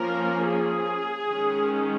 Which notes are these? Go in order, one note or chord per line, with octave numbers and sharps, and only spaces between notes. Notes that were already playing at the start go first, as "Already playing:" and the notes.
Already playing: F3 A#3 C#4 A#4
G#4
D#3 G#3 C#4